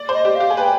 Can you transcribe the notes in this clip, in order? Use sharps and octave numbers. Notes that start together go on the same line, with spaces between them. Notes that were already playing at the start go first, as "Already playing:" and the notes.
Already playing: D5
C5
D#5
G4
G4 F5
G#4
B4 G5 G#5